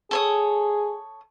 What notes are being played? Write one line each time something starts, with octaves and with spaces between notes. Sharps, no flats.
G#4 A4 C#5 D#6